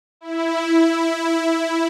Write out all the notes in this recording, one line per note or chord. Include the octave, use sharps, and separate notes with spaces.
E4